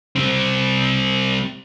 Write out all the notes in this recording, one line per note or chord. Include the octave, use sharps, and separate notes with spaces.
G3 C4